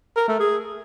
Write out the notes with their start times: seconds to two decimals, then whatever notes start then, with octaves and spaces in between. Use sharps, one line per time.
0.16 A#4
0.28 A3
0.40 G#4